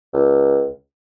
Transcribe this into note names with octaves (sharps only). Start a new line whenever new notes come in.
C#2